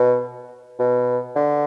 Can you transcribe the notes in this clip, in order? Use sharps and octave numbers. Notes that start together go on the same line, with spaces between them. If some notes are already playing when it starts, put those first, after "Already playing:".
Already playing: B2
B2
D3